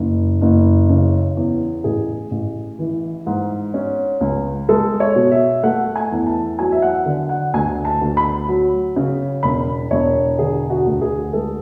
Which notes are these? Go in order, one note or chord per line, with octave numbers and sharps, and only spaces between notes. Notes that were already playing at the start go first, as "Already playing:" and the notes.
Already playing: F#1
F#1
C#3
E2
A1 G#4
A1
E3
G#2
C#4
C#2
G#3 A4
C#5
B2
E5
A3 F#5
G#5
E2
A5
F#3 G#5
E5
F#5
D3
F#5
D2 G#5
A5
D2
B5
F#3
C#3
E1 B5
E1 C#5
D3 G#4
F#4
D2
G#4
G#3 A4